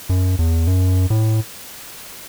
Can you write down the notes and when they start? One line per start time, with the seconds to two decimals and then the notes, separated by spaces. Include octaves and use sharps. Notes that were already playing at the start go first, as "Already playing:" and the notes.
0.09 F#2
0.39 E2
0.67 F#2
1.10 A2